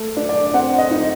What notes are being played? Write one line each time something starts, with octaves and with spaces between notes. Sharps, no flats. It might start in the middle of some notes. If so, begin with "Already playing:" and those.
Already playing: A3
D4
D5
C4 F#5
D#5
D#4